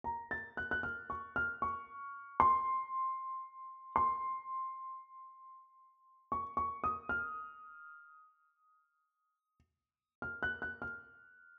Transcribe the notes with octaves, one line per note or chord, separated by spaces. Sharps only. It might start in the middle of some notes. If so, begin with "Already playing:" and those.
A#5
A6
F#6
F#6
F6
C#6
F6
C#6
C6
C6
C#6
C#6
D#6
F6
F6
F#6
F#6
F6